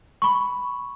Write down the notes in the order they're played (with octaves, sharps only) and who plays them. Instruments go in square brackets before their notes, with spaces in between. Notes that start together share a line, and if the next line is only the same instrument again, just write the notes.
[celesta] B5 C#6